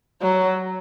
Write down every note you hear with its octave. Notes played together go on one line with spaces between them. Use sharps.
F#3